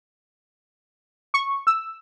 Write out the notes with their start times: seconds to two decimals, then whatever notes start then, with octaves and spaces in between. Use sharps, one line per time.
1.34 C#6
1.67 E6